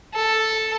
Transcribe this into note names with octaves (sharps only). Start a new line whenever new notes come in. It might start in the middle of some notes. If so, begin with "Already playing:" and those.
A4